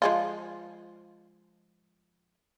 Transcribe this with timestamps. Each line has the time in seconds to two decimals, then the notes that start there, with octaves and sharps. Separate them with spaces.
0.02 F3 G#3 F4